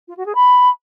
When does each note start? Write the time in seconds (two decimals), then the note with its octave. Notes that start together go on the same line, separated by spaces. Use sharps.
0.08 F4
0.17 F#4
0.26 G#4
0.35 B5